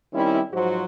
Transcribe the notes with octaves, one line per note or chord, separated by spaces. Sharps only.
D#3 G3 C4 C#4 E4
G#2 F3 F#3 F#4 C5